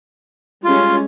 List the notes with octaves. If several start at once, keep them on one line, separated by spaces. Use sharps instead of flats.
G3 G#3 C#4 F4